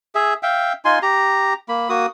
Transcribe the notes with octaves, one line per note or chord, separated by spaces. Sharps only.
G#4 E5
E5 F5 G5
D#4 F4 G#5 C6
G4 A#5
A#3 B5
A#3 F#4 D#6